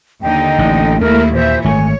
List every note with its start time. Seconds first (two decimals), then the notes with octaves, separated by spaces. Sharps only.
0.22 D#2 D3 D#4 G5
0.58 A1
1.01 D#2 A3 A#3 E4 A#4
1.34 A#2 E3 C5 E5
1.64 G#1 A3 C#5 G#5